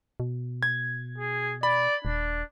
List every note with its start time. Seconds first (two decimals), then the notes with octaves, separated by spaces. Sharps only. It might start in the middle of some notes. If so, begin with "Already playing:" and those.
0.20 B2
0.63 G#6
1.18 G#4
1.63 D5 B5
2.05 D#1 D4